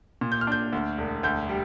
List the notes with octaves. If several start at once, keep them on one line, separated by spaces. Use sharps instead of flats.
A#2
G6
F6
D4 G6
D2
E1
D2 G6
G3